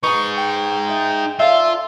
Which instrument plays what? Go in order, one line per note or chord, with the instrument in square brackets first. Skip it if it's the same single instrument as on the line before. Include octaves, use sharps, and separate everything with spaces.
[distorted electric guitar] D#4 G#4 [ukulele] B4 [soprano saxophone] C#6
[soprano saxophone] G5
[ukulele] E5
[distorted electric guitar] F4 [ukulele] A4 D5 F5 [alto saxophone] E5